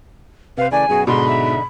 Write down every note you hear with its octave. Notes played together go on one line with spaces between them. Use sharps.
C3 B4 C5 F5
C#3 E3 A3 D5 G#5
F#2 B2 F#4 G#4
G#2 B2 D3 D#4 B5 C6
E5